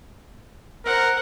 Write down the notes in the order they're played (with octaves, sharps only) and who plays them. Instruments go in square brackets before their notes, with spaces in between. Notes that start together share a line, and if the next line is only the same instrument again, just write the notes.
[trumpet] A#4 [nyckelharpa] C5 F#5